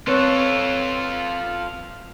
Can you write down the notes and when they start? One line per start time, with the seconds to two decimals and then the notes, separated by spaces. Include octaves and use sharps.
0.07 C4 F4 A4 B4 C#5